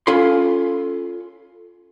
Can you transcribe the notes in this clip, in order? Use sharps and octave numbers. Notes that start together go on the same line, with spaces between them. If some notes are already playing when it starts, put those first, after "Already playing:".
C#4 F4 A4 G#5 B5 C6